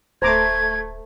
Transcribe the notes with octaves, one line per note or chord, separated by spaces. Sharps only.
D1 A3 C5 A#5 D6 G#6